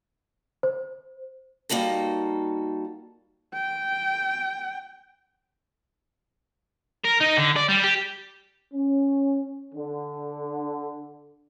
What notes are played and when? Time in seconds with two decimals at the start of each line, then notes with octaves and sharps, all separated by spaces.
0.63 C5
1.69 G3 A#3 D#4 F#4 A4
3.54 G5
7.05 A#4
7.21 D#4
7.37 D3
7.56 D5
7.69 G3
7.84 G4
8.73 C#4
9.74 D3